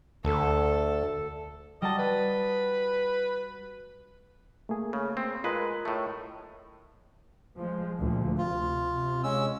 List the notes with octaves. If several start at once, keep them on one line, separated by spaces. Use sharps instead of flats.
D2 A4
G3 F#4 D#5 A5
B4
A3 A#3 G#4
C#3
C4
G#3 F4 A#4 B4 D#5
A2 A3
F3 G#3
D2 A#2 F3
C3 F4
C3
G#3 C#4 E6